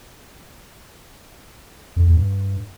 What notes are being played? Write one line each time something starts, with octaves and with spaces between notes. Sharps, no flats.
F2
E2
G2